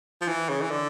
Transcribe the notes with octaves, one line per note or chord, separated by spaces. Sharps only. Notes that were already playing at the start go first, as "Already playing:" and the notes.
F3
E3
C#3
E3
D3